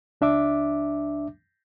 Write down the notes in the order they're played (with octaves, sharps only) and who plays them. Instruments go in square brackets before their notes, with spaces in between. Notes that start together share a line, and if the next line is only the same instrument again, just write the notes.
[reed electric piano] C#2 D4 E5 D6